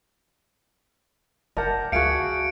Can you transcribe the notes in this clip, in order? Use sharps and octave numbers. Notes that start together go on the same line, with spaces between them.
F#1 A#4 D5 F#5 A5 G6
D2 F#4 G#4 E5 F5 C#7 D7